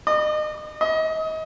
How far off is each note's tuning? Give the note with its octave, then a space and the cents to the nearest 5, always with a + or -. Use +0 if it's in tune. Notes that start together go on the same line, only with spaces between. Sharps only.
D#5 -35
D#5 +30